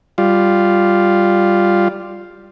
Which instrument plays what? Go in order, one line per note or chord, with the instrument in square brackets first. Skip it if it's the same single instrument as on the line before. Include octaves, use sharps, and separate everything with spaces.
[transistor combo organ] G3 F4